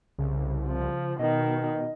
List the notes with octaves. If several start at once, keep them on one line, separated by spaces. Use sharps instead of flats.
C2 C#3
F3
B2 D#3 D#5